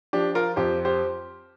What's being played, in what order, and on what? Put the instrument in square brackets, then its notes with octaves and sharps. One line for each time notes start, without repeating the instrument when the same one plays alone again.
[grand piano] F3 D4 G4
F4 A#4
F2 G4 C5
G4 C5